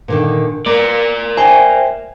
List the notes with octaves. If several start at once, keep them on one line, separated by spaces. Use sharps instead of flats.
A#2 D3 D#3
A#3 A#4 D5
C5 E5 G5 G#5